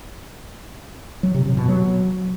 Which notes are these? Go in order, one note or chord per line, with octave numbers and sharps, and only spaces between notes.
F#3
C3
C3
B2
F#3